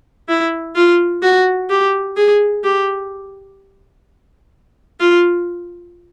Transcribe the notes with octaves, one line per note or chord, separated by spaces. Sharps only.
E4
F4
F#4
G4
G#4
G4
F4